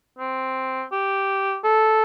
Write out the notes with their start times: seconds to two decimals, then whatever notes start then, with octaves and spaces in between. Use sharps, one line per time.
0.19 C4
0.92 G4
1.64 A4